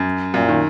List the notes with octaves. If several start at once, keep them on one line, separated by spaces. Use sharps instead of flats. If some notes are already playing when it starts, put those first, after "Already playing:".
Already playing: F#2
F#2 A#2
D#3